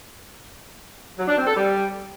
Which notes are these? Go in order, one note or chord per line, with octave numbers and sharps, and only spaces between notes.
F#3
D4
C4
A4
G3